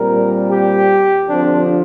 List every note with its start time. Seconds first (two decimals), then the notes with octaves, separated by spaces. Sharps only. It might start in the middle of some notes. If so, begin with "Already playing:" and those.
Already playing: A#2 G3 C4 A#4
0.50 G4
1.27 D3 F3 C4 D4